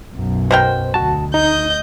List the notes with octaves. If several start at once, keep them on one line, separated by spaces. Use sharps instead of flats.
B1 F#2
B2 A#4 C5 G5
D2 F#4 A5
D#4 D#5 G6